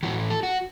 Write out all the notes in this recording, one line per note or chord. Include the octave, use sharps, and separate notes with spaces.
A2 E3 F#4
A4
F#4